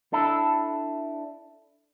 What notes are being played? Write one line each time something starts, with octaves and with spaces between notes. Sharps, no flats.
D4 E4 A4